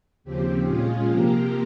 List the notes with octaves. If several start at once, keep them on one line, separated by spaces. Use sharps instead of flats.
D#2 C#3 F3 C4 G4
A#2 G#3 C#4 F4 G#4
C3 F3 A#3 G4 A#4